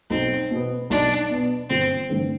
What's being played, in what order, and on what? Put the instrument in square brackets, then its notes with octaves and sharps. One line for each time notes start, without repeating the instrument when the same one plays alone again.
[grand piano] B1 [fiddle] C4
[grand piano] B2 B3
[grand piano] B1 [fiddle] D4
[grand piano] B2 B3
[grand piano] G1 [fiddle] C4
[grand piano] G2 D3 A3 C4